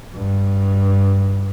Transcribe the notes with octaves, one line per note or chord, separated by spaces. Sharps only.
G2